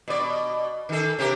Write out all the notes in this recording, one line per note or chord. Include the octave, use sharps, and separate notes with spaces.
B2 D5
D#3 A4
C3 G4 A#4